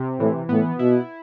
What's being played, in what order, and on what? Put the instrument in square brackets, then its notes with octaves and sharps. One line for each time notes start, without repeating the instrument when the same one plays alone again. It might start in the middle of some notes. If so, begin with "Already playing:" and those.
Already playing: [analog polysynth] C3
[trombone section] A2 [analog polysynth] E3
[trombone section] A2 [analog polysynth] B3
[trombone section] B2 [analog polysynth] E4